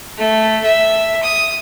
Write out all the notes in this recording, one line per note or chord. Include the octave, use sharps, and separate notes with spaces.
A3
E5
D#6